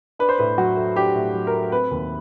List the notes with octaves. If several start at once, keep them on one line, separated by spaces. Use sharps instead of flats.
D4 B4
C5
A2 B4
F#3 F#4
A3
D4 G4
A2
F#3
A#4
A3
C4 B4
D#2